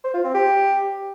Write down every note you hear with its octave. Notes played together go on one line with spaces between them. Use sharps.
C5
F4
C4
G4